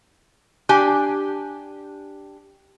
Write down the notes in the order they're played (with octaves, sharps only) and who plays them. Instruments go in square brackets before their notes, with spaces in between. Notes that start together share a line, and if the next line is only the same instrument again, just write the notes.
[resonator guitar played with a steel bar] D4 G4 G#5